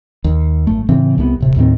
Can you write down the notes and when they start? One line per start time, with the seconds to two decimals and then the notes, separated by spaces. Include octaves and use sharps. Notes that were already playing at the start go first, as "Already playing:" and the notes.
0.24 D#2
0.67 G#1 F#2 A3
0.89 A2 C#3 E3 C4
1.18 C2 C3 G#3 B3
1.40 D#1 C3
1.56 D#2 A2 D#3 C4